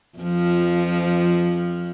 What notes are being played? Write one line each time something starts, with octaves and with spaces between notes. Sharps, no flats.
F2 F3